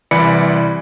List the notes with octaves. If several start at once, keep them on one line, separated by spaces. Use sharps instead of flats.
C2 E3 D5 B5 C#7